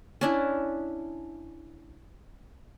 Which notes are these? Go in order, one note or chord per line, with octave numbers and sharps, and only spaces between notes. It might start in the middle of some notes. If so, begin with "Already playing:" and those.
C#4 D4 E4